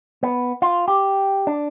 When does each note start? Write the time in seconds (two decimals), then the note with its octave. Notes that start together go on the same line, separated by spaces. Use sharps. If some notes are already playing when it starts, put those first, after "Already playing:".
0.23 B3
0.62 F4
0.88 G4
1.47 D4